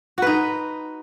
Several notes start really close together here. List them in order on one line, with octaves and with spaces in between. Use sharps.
F#4 B4 D#4